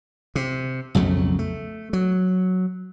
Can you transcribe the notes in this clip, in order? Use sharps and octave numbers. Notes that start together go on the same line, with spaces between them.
C3
B1 F2 C#3 A3
A3
F#3